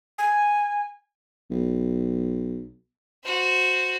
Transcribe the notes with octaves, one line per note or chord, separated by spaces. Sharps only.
G#5
B1
F#4 C5